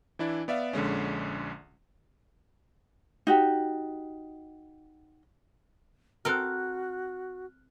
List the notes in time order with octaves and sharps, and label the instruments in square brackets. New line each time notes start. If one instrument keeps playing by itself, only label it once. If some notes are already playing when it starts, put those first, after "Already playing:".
[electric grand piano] E3 D4 E4 D5
B3 D5 E5 F5
A#1 D3 G#3 C#4
[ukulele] D#4 F#4 G4
[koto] C4 A4 A#4 [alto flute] F#4 [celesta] F6 F#6